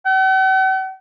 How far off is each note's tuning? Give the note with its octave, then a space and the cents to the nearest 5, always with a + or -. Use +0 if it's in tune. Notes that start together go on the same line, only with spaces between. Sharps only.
F#5 +45